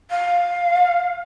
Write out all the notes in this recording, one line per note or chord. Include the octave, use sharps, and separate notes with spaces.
F5